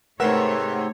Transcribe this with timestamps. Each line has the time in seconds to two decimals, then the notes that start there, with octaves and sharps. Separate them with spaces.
0.20 G#2 C3 A3 A#4 B4 C#5 E5 F#5